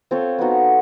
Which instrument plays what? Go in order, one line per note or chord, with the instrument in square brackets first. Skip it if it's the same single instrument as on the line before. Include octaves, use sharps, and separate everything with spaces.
[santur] C4 F4 A4 C#5
B3 D#4 F#4